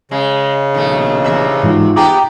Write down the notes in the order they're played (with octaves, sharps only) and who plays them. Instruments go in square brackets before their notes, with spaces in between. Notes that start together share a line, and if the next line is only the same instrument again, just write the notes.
[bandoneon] C#3 [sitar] G#3
[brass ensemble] A#1 B2 A#3 [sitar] D#3 A3
[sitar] E2 C3 E5
[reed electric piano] G#2 E3 G#3 [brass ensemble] D#4 F4 F#4
[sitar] B3 G4 G#4 [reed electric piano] G5 A#5 D6